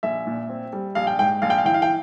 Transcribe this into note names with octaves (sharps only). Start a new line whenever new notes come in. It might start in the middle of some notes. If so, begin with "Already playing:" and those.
A#1 E5
A#2
C4
G3
A#1 F5
G5
G#2 G5
A#1 F5
G5
F5
E3 G5
F5
G5